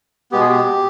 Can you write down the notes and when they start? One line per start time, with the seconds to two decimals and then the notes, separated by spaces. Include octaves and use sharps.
0.32 B2 G#3 B3 G4
0.41 G#4
0.49 G4